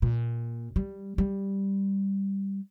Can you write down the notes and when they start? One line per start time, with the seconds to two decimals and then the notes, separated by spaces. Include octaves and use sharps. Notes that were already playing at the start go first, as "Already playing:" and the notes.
0.02 A#2
0.76 G3
1.18 G3